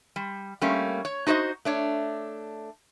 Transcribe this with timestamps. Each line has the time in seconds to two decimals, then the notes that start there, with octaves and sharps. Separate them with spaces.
0.16 G3
0.61 G3 A3 A#3 C#4
1.05 C#5
1.27 D#4 F#4 C5 D5 D#5
1.65 A3 D4 C#5